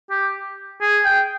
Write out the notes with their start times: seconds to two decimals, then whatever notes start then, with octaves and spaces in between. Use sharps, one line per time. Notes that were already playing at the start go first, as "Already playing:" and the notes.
0.10 G4
0.81 G#4
1.05 G5